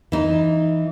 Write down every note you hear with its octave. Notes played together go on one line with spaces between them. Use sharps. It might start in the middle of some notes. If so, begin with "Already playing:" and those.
E3 D#4